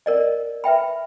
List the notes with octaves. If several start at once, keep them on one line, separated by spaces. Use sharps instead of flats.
A#4 D5 D#5
B4 E5 G5 B5